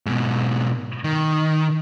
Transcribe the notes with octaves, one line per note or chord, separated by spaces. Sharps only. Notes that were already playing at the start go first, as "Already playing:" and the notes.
G#2 B2
D#3